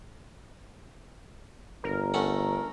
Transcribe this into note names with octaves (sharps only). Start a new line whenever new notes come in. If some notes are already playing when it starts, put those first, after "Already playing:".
G1 A#4
A3 C#4 F#5